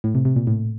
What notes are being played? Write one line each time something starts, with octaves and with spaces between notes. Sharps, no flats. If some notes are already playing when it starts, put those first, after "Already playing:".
A2
C3
C3
A#2
A2